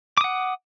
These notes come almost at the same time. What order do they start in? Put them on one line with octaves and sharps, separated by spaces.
D6 D#6 F#5